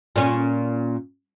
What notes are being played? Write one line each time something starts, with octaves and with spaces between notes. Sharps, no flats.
A#2 C#4